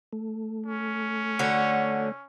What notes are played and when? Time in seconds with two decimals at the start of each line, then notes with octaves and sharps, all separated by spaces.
0.13 A3
0.66 C#4
1.39 D3 F#4 C#5